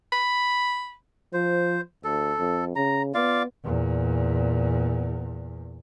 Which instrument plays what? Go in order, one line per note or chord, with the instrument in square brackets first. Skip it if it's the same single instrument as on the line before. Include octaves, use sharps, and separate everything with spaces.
[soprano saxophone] B5
[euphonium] F3 [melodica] C5
[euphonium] D2 [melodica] A4
[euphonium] F2
[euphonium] C#3 [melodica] A#5
[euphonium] B3 [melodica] F4 D5 F5
[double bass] E2 A#2